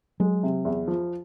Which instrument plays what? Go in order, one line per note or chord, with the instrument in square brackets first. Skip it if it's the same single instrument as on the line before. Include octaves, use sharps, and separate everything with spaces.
[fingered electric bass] F#3 [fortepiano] G#3
[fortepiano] C3
E2
F3